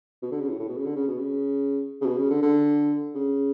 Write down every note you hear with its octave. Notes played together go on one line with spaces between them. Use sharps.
B2
D3
C#3
A2
A2
B2
C#3
D3
C#3
B2
C#3
C#3
B2
C#3
D3
D3
C#3